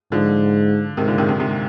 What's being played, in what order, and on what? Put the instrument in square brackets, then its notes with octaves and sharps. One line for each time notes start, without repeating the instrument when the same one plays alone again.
[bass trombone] G#2 [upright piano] D3 F3
[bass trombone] G#2 [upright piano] C3 D#3
[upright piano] A#2 D3
C3 D#3
C3 D#3
G#2 C3